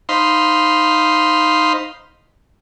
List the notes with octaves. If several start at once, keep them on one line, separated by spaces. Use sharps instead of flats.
D#4 C5 F5 B5 C6